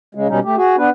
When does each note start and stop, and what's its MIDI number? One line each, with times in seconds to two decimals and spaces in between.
0.15 0.28 49
0.15 0.28 56
0.29 0.40 47
0.29 0.40 55
0.29 0.40 61
0.29 0.40 63
0.44 0.56 57
0.44 0.56 67
0.57 0.76 66
0.57 0.76 68
0.77 0.90 59
0.77 0.90 62
0.77 0.90 71